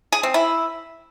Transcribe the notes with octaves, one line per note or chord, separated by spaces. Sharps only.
G#4
C4
E4